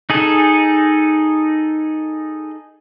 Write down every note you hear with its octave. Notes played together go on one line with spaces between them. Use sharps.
D#4 G#4 A4